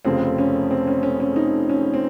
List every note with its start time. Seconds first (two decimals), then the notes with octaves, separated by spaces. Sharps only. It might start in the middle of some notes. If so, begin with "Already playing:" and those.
0.05 F1 F2 C#3 C4
0.38 C#4
0.71 C4
0.88 C#4
1.03 C#4
1.20 C#4
1.36 D#4
1.69 C#4
1.94 C4